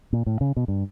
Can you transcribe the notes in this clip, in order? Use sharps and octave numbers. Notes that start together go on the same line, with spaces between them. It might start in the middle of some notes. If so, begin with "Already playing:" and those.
A#2
A2
C#3
B2
G2